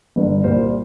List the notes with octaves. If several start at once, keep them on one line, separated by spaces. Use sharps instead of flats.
G1 G2 D3
C2 A#2 G3 A#3 C5